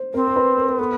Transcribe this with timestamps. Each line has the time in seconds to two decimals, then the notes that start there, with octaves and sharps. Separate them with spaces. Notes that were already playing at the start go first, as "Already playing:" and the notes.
Already playing: C5
0.14 C4 A#4
0.28 A#4
0.36 B4
0.57 A#4
0.69 A#4
0.79 B3 A4